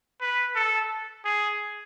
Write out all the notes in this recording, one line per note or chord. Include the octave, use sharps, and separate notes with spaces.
B4
A4
G#4